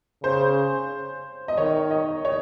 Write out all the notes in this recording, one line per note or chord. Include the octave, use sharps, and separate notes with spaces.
C#3 C5
D#5
D#3 C#5
D#5
C#5